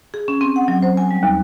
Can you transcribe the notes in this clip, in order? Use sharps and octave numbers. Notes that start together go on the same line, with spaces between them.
G#4
C#4
C4
F#5
F#3
C5
G#5
G3
D#2